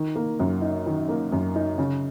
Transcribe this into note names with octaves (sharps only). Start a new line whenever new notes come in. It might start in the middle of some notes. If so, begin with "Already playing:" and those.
Already playing: D#3
A#3
F#2
D#4
D#3
A#3
F#2
D#4
C#3